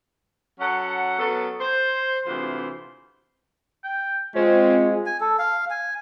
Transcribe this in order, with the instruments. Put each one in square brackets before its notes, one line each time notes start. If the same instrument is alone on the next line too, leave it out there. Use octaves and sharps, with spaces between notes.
[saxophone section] F#3 C#4 A4 F#5
F#3 B3 C#4 A4
C5
D2 C3 E3 F4 C5
[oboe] G5
[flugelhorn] G#3 [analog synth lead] C4 [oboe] C#4 [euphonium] F4
[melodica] G#5
A4
F5
G#5